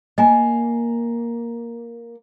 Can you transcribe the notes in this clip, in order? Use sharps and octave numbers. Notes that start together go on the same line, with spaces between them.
A#3 D#5 G#5 A#5